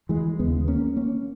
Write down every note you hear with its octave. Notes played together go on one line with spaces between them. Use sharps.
E3 G#3
D#2 C#3 G#3 B3
A#3 C#4
A#3 C#4